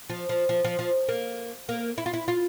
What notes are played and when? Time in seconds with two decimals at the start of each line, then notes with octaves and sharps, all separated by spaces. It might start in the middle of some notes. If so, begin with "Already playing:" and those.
0.09 F3
0.29 F3
0.49 F3
0.64 F3
0.79 F3
1.08 A#3
1.69 A#3
1.98 E4
2.06 F4
2.13 E4
2.28 F4